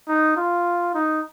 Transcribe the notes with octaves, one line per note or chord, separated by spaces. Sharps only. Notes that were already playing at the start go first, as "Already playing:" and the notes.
D#4
F4
D#4